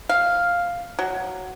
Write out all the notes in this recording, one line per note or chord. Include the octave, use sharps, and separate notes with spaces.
F5
F#3